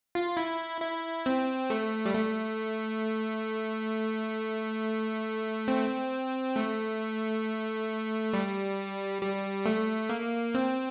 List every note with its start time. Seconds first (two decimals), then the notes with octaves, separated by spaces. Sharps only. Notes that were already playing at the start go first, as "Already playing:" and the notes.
0.15 F4
0.37 E4
0.81 E4
1.26 C4
1.70 A3
2.06 G3
2.14 A3
5.68 C4
6.56 A3
8.33 G3
9.22 G3
9.66 A3
10.09 A#3
10.55 C4